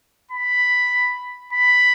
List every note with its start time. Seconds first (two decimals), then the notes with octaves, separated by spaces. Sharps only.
0.31 B5
1.53 B5